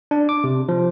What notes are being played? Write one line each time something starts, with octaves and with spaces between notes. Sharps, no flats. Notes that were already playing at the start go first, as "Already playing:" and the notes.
D4
D6
C3
F3